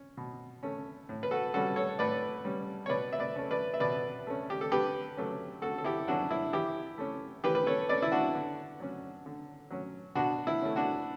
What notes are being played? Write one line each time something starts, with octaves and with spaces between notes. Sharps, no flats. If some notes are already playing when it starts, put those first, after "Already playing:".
Already playing: C#4
B2
A3 C#4
A2
B4
F#4 A4
G3 C#4 F#4 A4
A4 C#5
A2 B4 D5
G3 C#4
C#5
B2 B4 D5
E5
B4 D5
A3 C#4
B4 D5
E5
B2 B4 D5
A3 C#4
G4
A4
D3 G4 B4
F#3 A3 C#4
D3 F#4 A4
A4
E4 G4
F#3 A3 C#4 D4 F#4
E4
E3 E4 G4
A3 C#4
E3 G4 B4
B4
A4 C#5
A3 C#4 B4 D5
E4
D4 F#4
D3
F#3 C#4
D3
F#3 C#4
B2 D4 F#4
E4
A3 C#4
D4 F#4